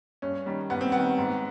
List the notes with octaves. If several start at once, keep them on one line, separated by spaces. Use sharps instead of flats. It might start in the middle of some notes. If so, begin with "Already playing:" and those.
G2 C#4
D#3 G3
G2 B3
C4
D#3 G3 B3
G#2